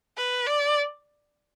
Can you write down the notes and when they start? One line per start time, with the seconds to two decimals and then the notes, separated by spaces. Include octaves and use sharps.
0.17 B4
0.46 D5